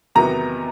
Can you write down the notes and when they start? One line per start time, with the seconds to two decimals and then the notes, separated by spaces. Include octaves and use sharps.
0.15 E2 C3 D#3 F#3 B3 A#5